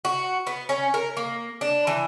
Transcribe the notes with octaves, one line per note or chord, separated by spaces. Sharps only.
F#4
B3
C#4
A#4
A#3
D4
E3